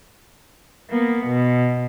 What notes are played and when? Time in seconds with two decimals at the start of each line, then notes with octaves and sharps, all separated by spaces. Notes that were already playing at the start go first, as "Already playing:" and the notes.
0.91 A#3 B3
1.26 B2